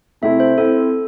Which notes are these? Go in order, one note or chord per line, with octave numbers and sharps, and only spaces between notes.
C3 A3 C4 E4 E5
C5
C4 E4 A4